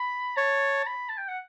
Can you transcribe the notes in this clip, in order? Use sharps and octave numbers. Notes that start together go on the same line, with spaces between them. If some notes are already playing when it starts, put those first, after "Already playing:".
Already playing: B5
C#5 A5
B5
A5
G5
F#5